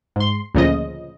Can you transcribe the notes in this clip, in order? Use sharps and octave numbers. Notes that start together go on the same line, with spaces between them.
G#2 C6
D2 A#2 C#3 F3 D#5